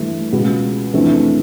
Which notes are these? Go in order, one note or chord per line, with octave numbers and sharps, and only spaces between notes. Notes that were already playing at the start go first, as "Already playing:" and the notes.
Already playing: G2 E3 A3
C#2 B2 G#3 B3
F2 C3 E3 A3 D4